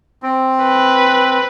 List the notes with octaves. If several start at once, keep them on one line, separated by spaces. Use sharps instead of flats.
C4
B4